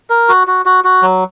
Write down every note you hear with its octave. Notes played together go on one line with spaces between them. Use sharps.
A#4
F#4
F#4
F#4
F#4
F#3